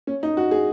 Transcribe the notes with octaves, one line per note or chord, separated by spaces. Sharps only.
C#4
D#4
F#4
G#4